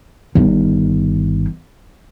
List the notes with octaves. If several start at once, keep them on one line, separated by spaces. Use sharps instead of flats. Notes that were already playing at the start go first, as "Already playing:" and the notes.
G1 D#3